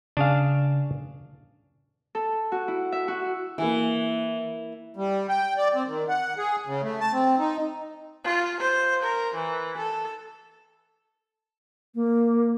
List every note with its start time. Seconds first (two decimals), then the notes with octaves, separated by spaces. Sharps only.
0.17 C#3 D4 G#4 F5
2.15 A4
2.52 F#4
2.68 E4
2.92 E5
3.08 F#4
3.58 E3 A#3 E4
4.97 G3
5.29 G5
5.57 D5
5.75 C4
5.87 D#3
6.08 F#5
6.38 G#4
6.67 C#3
6.82 A3
7.00 A5
7.13 C4
7.39 D#4
8.24 F4
8.60 C5
9.02 A#4
9.34 E3
9.77 A4
11.94 A#3